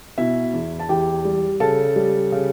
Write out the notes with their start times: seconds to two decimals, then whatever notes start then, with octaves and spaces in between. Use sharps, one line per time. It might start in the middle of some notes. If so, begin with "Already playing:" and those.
0.18 B2 E4 E5
0.53 E2
0.79 A5
0.89 E2 G4 G5
1.25 G3
1.60 C#3 A4 A5
1.96 G3
2.32 C#3